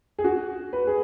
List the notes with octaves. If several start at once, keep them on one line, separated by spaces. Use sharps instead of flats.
G#4
F#4
B4
G#4